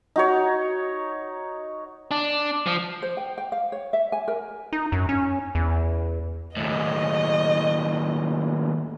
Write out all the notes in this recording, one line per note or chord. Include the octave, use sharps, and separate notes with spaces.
D#4 F#4 C#5
D4
F3
C5
G5
G5
F5
C#5
E5
G#5
A#4
D#4
F#2
C#4
E2
D#2 A2 D#5